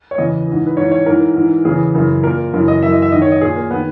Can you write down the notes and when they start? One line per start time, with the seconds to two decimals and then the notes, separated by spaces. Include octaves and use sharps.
0.11 C#5
0.18 E2 C#3 E3 D#5
0.47 G#2 E3
0.67 B4
0.77 G#2 E3 C#5
0.91 C#5
1.06 G#2 E3 A#4
1.36 G#2 E3
1.65 E2 C#3 E3 G#4
1.95 F#2 C#3 E3
2.23 A#2 A#4
2.53 F#2 C#3 E3
2.68 D#5
2.83 F#2 E3 E5
2.92 D#5
3.02 E5
3.12 G#2 D#3 D#5
3.22 C#5
3.32 D#5
3.41 A#2 G#4
3.56 A#3
3.71 D#3 B3